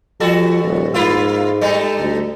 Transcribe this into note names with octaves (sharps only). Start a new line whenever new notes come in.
F3 G3 F#4 A4
D#1
G#2 A#3 E4 F4
G3 A3 D#4
D2